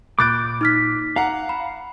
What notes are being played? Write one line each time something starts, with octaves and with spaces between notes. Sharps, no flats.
A#2 B5 D6 F#6 G6 A6 D7
D#4 F6 B6
F5 F#5 A#5
B5